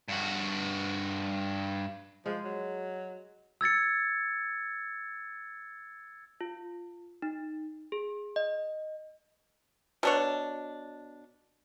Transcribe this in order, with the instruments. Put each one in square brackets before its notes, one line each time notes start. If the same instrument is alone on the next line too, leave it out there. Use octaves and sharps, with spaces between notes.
[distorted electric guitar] G2 F#4
[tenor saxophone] F3 [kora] G#3
[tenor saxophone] F#3
[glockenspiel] E6 G#6 A6 C#7
[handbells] F4
D#4
G#4
D#5
[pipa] B2 D4 C#5